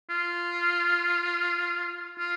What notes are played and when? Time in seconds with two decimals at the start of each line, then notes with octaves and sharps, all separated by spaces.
0.10 F4
2.19 F4